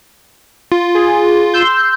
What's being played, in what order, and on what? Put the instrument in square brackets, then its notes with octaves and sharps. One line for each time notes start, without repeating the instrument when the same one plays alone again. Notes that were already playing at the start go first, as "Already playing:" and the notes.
[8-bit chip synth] F4
[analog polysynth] G#4
C6 E6 G6